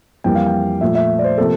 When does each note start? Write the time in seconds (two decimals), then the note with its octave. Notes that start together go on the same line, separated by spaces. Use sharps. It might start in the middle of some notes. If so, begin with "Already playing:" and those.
0.24 F2 E3 G3 A#3 G5
0.35 F5
0.46 G5
0.81 A#2 F3 A3 E5
0.95 E5
1.19 D5
1.24 C5
1.38 C3 F3 A#3 A4